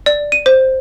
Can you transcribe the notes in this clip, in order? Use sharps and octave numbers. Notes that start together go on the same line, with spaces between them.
D5
D#7
C5